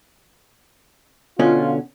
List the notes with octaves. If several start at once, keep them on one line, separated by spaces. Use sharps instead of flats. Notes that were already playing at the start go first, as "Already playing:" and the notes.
B2 D3 C#4 F4